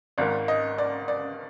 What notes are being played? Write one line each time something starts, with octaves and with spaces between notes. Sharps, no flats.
G#1 G#2 D#3 D5
D#5
D5
D5